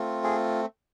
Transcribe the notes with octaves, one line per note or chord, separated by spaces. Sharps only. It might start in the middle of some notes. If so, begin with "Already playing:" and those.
Already playing: A3 C4 F4
G#4